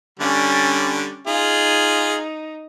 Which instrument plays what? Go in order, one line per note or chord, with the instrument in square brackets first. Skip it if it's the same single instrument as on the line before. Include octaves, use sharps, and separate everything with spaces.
[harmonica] D3 G3 [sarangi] C#4
[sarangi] D#4 [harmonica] F4 G#4